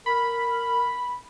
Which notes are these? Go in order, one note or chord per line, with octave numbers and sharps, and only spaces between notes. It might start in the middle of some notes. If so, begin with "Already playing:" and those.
A#4 B5